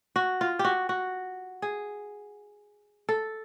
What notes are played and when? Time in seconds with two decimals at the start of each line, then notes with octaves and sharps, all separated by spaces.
0.16 F#4
0.41 F4
0.59 G4
0.65 F#4
0.89 F#4
1.62 G#4
3.09 A4